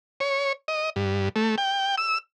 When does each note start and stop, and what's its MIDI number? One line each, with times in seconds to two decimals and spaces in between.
0.20 0.53 73
0.68 0.90 75
0.96 1.29 43
1.36 1.56 57
1.58 1.96 79
1.98 2.18 88